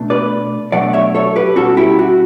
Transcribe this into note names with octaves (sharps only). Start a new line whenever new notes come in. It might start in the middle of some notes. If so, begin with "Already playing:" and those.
Already playing: B2 A3 D4
B4 D5
B2 F#3 A3 D4 D5 F#5
C#5 E5
A4 C#5
G4 B4
B2 G3 C#4 F#4 A4
E4 G4
F#4